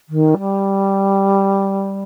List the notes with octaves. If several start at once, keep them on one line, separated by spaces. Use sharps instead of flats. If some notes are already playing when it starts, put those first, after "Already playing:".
D#3
G3